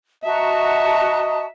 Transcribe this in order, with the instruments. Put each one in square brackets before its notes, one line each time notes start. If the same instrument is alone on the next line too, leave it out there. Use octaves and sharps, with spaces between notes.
[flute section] F#4 A5 A#5 [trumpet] D#5 [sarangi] E5